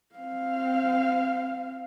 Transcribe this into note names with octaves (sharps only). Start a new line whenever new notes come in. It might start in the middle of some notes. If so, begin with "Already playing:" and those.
C4 F5